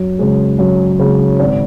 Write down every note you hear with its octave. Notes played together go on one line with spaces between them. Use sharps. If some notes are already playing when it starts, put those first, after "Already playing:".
Already playing: F#2
C#3 G#3
F#2
C#3 G#3
G#1